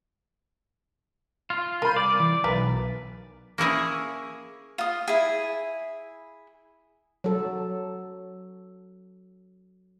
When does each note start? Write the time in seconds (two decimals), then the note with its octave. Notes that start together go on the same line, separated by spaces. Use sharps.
1.50 F4
1.82 C2 A#4 B5 G6 C7 D#7
1.96 D5 D6
2.20 E3
2.44 B1 E3 A#4 B4
3.58 A#3 C#4 E4 G#4
4.78 F4 D#6
5.08 E4 G#4
7.24 F#3 A4